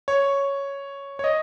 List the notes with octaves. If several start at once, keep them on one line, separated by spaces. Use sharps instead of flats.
C#5
C#5
D#5